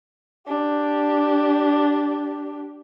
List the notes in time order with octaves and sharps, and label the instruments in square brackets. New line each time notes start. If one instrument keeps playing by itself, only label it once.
[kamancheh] D4 G4